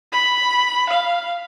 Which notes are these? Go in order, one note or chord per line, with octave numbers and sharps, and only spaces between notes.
B5
F5